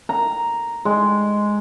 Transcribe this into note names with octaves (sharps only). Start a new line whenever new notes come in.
A#5
G#3